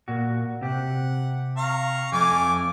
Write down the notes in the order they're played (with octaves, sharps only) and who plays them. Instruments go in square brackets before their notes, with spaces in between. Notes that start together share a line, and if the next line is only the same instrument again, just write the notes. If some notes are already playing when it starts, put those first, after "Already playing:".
[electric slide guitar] A#2 F#4
[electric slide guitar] C3 G4 [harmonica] F#5
[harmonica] F5 A#5 C#6
[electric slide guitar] F2 [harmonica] A3 G#5 D6